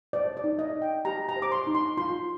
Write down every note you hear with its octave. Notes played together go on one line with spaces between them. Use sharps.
C5 D5
D5
D#4
D#5
D#4
G5
G4 A#5
A#5
C5
D6
C6
D#4
C6
F4 C6